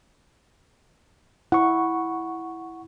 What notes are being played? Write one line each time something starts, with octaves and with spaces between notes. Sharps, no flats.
E4 F#5 C#6